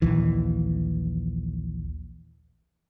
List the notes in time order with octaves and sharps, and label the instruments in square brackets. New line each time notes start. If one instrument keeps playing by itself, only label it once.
[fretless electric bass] A#1 D#2 E3